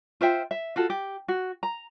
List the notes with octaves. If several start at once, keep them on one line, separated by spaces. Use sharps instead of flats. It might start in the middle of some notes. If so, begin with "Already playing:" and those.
F4 C5 E5 G5
E5
F4 F#4 A4
G4
F#4
A#5